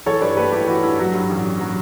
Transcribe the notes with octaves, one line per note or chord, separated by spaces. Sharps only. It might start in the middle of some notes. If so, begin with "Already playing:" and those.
E3 A4 C#5
G2 B4 D5
A3 G4 B4
G1 E4 G4
E3 F#4
G2 E4
F#3 F#4
G2
A1
A1
F#3